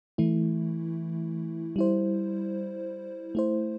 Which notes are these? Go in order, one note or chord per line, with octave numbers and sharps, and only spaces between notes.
E3 A3 E4
G3 E4 C5
A3 E4 C5